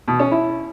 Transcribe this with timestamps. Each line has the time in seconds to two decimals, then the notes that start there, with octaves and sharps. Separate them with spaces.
0.08 B2
0.20 C#4
0.32 E4